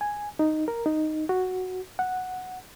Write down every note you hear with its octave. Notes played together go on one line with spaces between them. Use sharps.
G#5
D#4
A#4
D#4
F#4
F#5